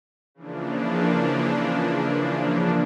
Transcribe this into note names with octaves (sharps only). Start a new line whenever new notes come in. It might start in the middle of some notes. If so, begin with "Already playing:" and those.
C#3 E3 F3 A#3 D4